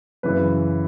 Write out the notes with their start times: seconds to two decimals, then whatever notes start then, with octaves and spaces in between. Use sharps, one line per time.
0.23 F#2 C#3 E3 B4